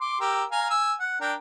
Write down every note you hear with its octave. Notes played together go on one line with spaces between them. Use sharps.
C6 D6
G4 A#4 E6
F5 G#5 A#5
G#5 E6
F#5
D4 A#4 G5